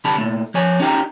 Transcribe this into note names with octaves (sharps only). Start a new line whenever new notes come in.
C2 D3 G3 A5 B5
A#2 A3
F3 C#5 G#5
C#4 D#4 G4 D5 G5 A#5